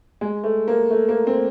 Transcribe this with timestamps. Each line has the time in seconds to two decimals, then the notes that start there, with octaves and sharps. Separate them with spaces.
0.21 G#3
0.44 A3
0.68 A#3
0.90 A3
1.09 A#3
1.27 C4